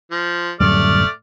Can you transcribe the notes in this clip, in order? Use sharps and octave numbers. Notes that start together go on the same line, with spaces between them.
F3
D1 F#2 G3 A3 D5 F6